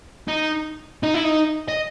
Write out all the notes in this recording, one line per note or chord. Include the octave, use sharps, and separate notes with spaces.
D#4
D#4
E4
D#4
D#5